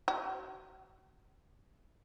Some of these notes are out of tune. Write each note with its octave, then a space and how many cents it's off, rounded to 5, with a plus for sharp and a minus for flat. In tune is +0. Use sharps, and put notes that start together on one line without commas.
F#4 +35